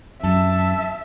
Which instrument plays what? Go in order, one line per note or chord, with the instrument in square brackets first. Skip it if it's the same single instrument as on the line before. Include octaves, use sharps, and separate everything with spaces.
[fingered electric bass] F#2 [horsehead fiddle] E5 [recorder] A5